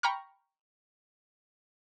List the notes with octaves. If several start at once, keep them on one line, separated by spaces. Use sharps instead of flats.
G5 A#5 B5 C#6 F6